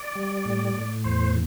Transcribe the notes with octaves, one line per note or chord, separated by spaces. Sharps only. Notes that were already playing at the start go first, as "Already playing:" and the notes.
Already playing: D5
G3
A2
A2
E2 C5